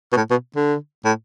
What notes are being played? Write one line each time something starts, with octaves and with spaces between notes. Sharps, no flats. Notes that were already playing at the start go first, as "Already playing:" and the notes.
B2
A2
B2
D3
A2